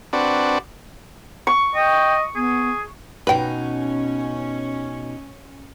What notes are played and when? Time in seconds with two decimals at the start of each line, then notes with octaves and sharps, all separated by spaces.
0.13 C4 D4 F#4 B4 D5
1.47 C#6
1.75 D#5 G5
2.35 B3 G#4
3.27 B2 C#4 D#4 B4 G5